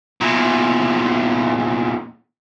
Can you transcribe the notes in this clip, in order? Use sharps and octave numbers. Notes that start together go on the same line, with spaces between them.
E2 A#2